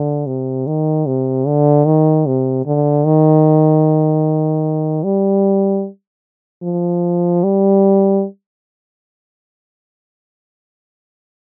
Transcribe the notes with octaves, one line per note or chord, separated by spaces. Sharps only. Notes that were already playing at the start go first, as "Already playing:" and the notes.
Already playing: D3
C3
D#3
C3
D3
D#3
C3
D3
D#3
G3
F3
G3